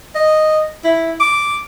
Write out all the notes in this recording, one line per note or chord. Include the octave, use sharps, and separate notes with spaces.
D#5
E4
D6